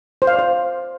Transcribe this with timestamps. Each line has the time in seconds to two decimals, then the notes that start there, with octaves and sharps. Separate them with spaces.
0.22 C5
0.27 F5
0.33 D5
0.39 C5